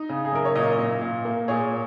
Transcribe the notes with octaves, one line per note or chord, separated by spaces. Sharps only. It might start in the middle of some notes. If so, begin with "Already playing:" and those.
Already playing: D#4
C#3
G#4
F#2 A#4
C#5
A#2 A#4 D#5
A#2
A#2
A#3
A#2 G#4 C#5